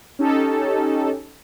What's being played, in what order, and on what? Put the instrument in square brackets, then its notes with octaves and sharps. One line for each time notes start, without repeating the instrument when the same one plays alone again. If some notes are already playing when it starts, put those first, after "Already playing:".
[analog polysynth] C#4 D#4 G4 A4